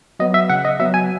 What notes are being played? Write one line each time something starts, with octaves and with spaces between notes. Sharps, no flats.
F#3 B3 D#5
E5
C#3 F#5
D#5
F#3 B3 E5
G#5